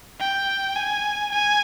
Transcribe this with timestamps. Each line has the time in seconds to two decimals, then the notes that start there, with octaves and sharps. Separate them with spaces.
0.20 G5
0.76 G#5
1.32 G#5